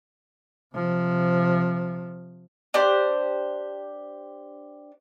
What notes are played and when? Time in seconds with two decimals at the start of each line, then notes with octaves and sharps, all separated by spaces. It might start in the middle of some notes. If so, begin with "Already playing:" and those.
0.74 C3 F3
2.74 D4 G4 C5